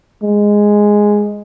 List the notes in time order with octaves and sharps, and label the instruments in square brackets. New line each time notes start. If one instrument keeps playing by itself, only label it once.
[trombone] G#3